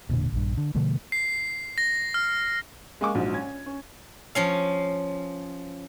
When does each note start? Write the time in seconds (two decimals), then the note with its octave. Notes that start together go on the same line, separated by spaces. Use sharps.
0.09 E1 A#2 D3
0.32 A#1 G2
0.57 D3
0.75 B2 D3 F3 A3
1.12 C7
1.78 A#6
2.14 F6
3.01 G#3 A#3 G#5 C#6 D6
3.15 A#1 G#2 F#3
3.33 C#4 G#6
3.66 C#4
4.35 F3 C#4 F5